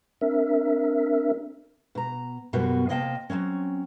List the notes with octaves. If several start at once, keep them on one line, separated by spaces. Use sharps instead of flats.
C4 D4 A#4 E5
B2 A#5
F#2 B2 G3 B3 F#4
C3 A#3 D#5 F5 G5 A5
F#3 G#3 C4 C#4